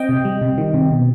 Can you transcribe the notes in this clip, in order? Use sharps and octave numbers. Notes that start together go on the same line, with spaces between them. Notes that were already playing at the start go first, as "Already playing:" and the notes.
Already playing: C4 D#5 G5
C3
G3
C3
D#3
C3
B2